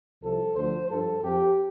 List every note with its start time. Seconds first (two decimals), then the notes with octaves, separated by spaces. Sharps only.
0.22 C2 C3 F3 A4
0.55 D2 D3 F3 C5
0.89 G2 F3 A4
1.22 F2 F3 G4